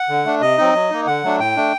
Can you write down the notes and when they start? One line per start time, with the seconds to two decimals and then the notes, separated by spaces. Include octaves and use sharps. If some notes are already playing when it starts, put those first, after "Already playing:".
Already playing: F#5
0.09 D3
0.25 A3 D4
0.41 C3 D#5
0.58 F#3 C4 D#4
0.74 F#3
0.90 A#3 D#4
1.07 D3 F#5
1.24 F#3 A3 D4
1.40 A2 G5
1.56 A3 D4